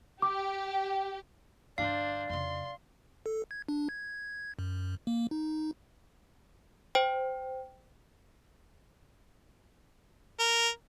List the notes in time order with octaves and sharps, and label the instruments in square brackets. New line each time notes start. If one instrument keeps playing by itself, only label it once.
[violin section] G4 [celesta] D6
[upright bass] G2 D3 [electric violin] D4 C5 [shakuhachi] D5 [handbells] F5
[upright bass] F2 C#3 [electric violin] C6
[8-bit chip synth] A4
G#6
D4
G#6
F#2
A#3
D#4
[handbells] C5 G5
[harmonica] A#4